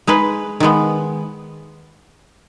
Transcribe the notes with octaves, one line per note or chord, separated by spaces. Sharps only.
G#3 D#4 G#4 B4
D#3 G#3 B3